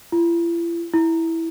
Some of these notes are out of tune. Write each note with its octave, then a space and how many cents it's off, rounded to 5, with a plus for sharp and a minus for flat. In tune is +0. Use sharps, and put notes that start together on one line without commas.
E4 +45
E4 -5